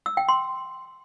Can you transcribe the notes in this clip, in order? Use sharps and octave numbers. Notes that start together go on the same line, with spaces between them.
E6
G5
C6